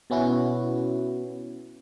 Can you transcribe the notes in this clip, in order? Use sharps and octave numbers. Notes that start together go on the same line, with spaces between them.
B2 B3 C#4 E4 F#4